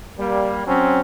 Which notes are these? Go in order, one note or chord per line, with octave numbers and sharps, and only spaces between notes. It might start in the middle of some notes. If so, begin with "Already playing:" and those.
G3 A#3
F#3 C4 C#4